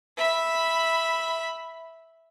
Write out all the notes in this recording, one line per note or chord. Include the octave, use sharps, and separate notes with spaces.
E5 B5